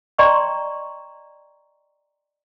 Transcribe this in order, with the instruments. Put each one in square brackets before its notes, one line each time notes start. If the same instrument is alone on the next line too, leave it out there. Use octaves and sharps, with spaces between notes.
[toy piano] D5 D#5 G5 A#5 C6 C#6